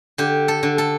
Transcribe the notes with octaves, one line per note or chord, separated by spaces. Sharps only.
D3 G4
A4
D3
A4